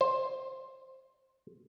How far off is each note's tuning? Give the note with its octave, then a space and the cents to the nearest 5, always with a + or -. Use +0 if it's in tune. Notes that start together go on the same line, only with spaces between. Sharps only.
C5 +10